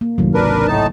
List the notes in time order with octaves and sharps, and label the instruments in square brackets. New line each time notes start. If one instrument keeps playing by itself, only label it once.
[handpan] A#3
[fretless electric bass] C2 F#2 A2 [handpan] D#3 F#3
[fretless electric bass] G#1 C#2 C3 [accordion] D4 A#4 B4
[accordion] A2 D#4 A5